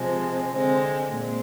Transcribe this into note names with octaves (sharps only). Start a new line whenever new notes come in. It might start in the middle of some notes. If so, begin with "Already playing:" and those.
Already playing: C3 F3 G#3 C4
D3 G#3 C4
A#2 G#3 C4